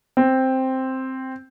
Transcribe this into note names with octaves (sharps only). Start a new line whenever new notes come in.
C4